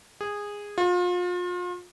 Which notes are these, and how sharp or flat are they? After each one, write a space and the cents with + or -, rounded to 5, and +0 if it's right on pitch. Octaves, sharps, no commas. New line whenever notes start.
G#4 -15
F4 +35